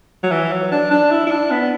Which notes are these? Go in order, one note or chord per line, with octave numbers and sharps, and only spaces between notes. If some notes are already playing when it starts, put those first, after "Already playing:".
F#3
E3
F#3
D4
D4
E4
E4
D4
B3